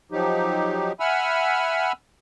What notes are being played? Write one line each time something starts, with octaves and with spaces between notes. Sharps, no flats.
F3 F#3 D#4 G4
E5 F#5 G#5 B5 E6 F6